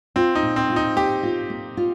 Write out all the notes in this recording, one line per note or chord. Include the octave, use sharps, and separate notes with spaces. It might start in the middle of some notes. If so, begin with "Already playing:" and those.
C4 F4
D#4
A#2
C4
F4
D#4
A#3 G4
F4
A#3
F4